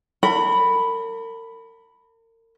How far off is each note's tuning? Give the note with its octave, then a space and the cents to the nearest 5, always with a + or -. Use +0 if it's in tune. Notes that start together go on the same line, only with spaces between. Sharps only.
A#4 -40 B5 +0